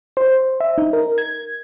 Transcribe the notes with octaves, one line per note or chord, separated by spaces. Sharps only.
C5
E5
D#4
A#4
G#6